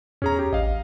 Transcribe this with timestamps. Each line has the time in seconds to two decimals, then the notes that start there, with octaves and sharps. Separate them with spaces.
0.22 E2 C#4 G#4 A#5
0.39 G4
0.53 A1 D#5 F5